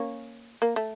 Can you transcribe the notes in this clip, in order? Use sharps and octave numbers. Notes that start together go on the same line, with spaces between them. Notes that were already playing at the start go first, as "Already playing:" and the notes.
Already playing: A#3 C#4
A#3
A3